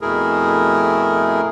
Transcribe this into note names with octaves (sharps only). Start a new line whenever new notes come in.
F2 B2 A3 E4 G#4 A#4